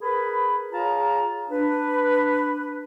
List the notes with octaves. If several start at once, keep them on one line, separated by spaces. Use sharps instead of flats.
G#4 A#4 B4 B5
F4 G#4 C#5 F5 A5 A#5
D4 B4